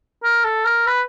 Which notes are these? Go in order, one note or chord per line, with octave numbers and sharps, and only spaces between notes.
A#4
A4
A#4
B4